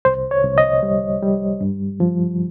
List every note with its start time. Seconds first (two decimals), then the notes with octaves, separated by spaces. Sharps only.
0.05 C2 C5
0.31 C#5
0.44 C2
0.58 D#5
0.83 G3
1.23 G3
1.61 G2
2.00 F3